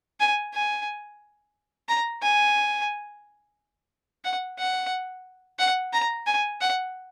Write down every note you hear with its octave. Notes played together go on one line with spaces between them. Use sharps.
G#5
G#5
A#5
G#5
F#5
F#5
F#5
A#5
G#5
F#5